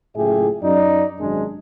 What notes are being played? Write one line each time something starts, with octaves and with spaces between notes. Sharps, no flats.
F#1 A2 F4 G4 G#4 E5
F#2 D#4 D5
G#1 F#2 C3 G#3 D4